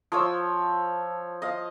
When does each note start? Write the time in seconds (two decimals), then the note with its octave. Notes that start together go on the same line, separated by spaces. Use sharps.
0.12 F3 C#5 E6
1.42 D#5 F5